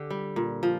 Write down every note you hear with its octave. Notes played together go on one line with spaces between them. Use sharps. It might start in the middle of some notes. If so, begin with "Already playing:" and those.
Already playing: D3 G4
G3
A#2
F3